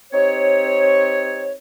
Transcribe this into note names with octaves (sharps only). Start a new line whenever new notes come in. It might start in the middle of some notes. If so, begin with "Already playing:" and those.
C4 D#4 G4 C#5